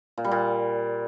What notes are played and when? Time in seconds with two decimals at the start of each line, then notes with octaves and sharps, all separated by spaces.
0.18 A#2
0.25 G3
0.31 A#2